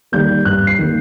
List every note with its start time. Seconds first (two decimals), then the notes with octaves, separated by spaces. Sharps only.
0.12 D#3 G3 A#3 G6
0.45 G2 F#6
0.67 C7
0.79 D#3 G3 A#3